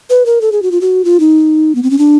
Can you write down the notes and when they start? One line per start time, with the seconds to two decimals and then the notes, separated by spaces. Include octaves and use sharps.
0.10 B4
0.26 A#4
0.41 A4
0.52 G#4
0.62 F#4
0.71 F4
0.81 F#4
1.05 F4
1.20 D#4
1.75 B3
1.83 C4
1.90 C#4
1.98 D4